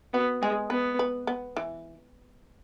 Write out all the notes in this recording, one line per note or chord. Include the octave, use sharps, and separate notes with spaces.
B3 F#4
G#3 G#4
B3 B4
B4
B3
E3